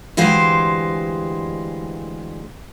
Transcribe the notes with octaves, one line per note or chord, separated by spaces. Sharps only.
D2 E3 G#3 G4 C5 F5